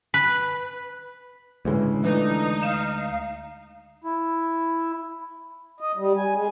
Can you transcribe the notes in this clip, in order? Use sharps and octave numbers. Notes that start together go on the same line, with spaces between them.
B4
D2 A2 C#3 E3 G#3
E3 A3 D4 D#4
F5 E7
E4
D#5
G3
G#5
G#3